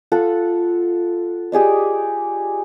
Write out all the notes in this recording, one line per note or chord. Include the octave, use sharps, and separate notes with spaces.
F4 A4 F#5
G4 G#4 D5 D#5